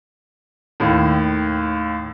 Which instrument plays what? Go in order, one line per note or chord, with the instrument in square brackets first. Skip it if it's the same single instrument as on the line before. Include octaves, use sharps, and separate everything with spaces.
[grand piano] D#2 A2